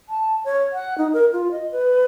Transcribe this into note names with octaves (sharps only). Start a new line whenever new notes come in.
A5
C#5
F#5
D#4
A#4
F4
D#5
B4